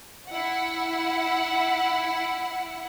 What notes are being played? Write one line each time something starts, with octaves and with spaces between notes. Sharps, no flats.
E4 F#5